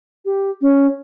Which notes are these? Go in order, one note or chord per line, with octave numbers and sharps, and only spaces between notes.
G4
C#4